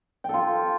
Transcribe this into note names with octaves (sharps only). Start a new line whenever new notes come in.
F4 A4 G5